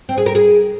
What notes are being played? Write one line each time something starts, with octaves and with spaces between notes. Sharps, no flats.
C4
G#4
A#4
G#4